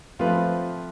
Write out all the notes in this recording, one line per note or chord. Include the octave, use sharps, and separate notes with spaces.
F3 A3 C4 F4 B4